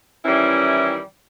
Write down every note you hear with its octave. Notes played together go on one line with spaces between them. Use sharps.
D#3 E3 G3 C#4 E4